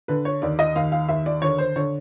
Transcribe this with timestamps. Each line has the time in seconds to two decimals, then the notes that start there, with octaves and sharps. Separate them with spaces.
0.08 D3 B4
0.25 C#5
0.42 D#2 D5
0.59 D#5
0.76 D#2 F5
0.92 F5
1.09 D#2 E5
1.26 D5
1.42 D3 C#5
1.58 C5
1.76 D3 C#5